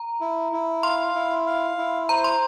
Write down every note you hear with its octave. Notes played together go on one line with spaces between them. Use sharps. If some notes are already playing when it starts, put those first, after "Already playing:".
Already playing: A#5
E4
E4
F5 C6
E4
F5
E4
C5 A#5
C6